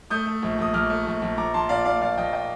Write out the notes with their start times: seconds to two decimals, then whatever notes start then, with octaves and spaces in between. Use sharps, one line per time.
0.10 A3 D#6 G6
0.26 A3
0.42 A#1
0.58 A#1 D#6
0.73 A#1 D6 F6
0.90 A3
1.06 A#1
1.22 A#1
1.37 A#1 A#5 D6
1.54 A#1 A5 C6
1.69 A#2 D5 F5
1.85 A#2 D5 F5
2.01 A#1 D5 F5
2.17 A#1 D#5 G5
2.33 D#5 G5